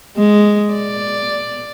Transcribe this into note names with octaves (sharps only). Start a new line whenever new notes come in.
G#3
D5